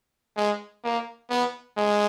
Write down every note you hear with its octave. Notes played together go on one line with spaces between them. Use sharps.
G#3
A#3
B3
G#3